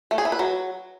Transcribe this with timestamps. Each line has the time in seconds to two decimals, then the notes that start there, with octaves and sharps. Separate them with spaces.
0.11 A3
0.18 G#4
0.25 E4
0.32 B4
0.39 F#3